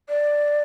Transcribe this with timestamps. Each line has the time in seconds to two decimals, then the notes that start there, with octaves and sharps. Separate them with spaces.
0.09 D5